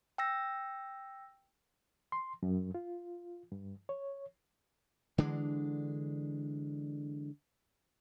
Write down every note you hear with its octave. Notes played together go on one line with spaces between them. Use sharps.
G5 E6 A#6
C6
F#2
F4
G2
C#5
D3 E3 G#3 D4